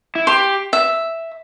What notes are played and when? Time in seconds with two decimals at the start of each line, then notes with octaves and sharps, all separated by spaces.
0.15 E4
0.27 G4 C6
0.73 E5